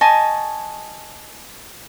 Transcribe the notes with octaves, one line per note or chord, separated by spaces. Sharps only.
D#5 G#5 A5 C#6